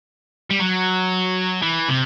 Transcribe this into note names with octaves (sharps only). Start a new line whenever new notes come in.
G3
F#3
E3
C3